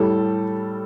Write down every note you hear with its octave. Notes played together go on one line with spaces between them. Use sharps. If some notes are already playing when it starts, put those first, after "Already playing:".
Already playing: A2 G3 A4